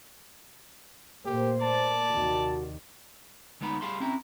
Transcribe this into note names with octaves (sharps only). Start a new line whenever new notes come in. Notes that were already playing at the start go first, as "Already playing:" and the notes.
A#2 A3 A#3 G4 C5
D5 A5
D#2 C3 D#3 F#4
D2 G#3 B3 D#4 B5
G3 G#4 F5 A5 B5 C6
C4 C#4 E4 A#5